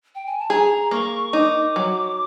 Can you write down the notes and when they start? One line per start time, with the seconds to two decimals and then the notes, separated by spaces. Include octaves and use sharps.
0.15 G5
0.27 G#5
0.39 A5
0.50 G#4 A#5
0.91 A#3 C#6
1.33 D#4 D6
1.76 F#3